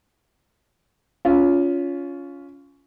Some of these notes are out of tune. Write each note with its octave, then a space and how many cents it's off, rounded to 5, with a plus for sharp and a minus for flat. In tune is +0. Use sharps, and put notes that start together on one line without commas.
C#4 +20 F4 +0